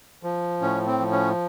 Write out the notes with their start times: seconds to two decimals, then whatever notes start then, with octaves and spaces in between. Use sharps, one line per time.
0.23 F3
0.61 A2 C#4
0.86 C4
0.99 F3
1.12 C#4